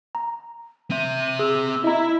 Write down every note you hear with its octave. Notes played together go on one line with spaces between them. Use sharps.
A#5
C4 E5 D#7
G#4 E6
E4 D#5 A#5